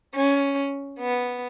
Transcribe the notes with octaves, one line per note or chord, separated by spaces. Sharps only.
C#4
B3